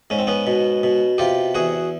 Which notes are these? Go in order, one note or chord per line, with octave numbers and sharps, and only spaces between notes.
G#2 C#4
C4
B3 C#4
B2
B2
C3 F4 G4
E2 F#4 G#4